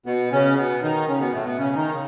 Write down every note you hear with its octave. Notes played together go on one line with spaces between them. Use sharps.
B2 B3
C#3 C#4
B2 B3
D#3 D#4
C#3 C#4
B2 B3
A2 A3
B2 B3
C#3 C#4
D#3 D#4
C#3